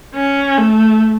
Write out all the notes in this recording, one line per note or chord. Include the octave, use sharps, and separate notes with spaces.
C#4
A3